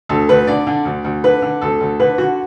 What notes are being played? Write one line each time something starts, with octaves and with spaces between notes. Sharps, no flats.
D2 A4
D2 B4
D3 D5
D3
D2
D2
D3 B4
D3
D2 A4
D2
D3 B4
D3 F#4